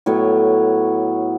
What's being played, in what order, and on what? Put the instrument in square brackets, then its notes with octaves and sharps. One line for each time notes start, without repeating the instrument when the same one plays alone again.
[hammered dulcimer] A2 F#3 B3 C#5